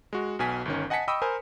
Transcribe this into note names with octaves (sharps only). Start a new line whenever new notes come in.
G#3 F#4
B1 B2 G#5 B6
G1 D#3 C#4
D#5 F#5 G#5 A5 B6 C#7
D#5 G5 B5 C#6 D#6 E6
A#4 C5 G#5 B5